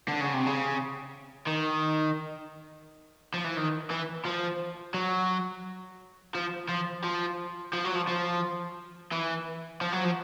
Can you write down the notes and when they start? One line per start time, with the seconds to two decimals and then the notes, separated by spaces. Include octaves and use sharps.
0.08 D3
0.21 C#3
0.34 C3
0.47 C#3
1.47 D#3
3.34 F3
3.44 E3
3.56 D#3
3.91 E3
4.26 F3
4.94 F#3
6.35 F3
6.69 F3
7.04 F3
7.73 F3
7.85 F#3
7.96 F3
8.08 F3
9.12 E3
9.81 F3
9.93 F#3
10.05 F3